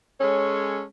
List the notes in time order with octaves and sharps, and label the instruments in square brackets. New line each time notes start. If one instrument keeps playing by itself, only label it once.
[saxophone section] G#3 C#4 A4 C#5